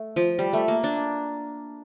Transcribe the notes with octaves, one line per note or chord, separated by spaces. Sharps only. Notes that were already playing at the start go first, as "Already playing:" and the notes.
Already playing: A3
F3
G3
A3
A#3
D4